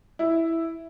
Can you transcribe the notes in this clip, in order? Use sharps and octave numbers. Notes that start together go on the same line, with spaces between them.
E4